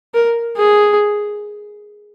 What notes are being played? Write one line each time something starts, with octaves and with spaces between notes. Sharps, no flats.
A#4
G#4